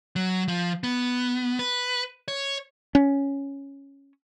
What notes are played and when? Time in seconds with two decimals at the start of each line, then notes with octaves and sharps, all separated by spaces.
0.16 F#3
0.48 F3
0.83 B3
1.59 B4
2.28 C#5
2.95 C#4